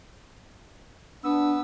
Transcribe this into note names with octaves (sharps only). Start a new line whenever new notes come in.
B3 D4 E6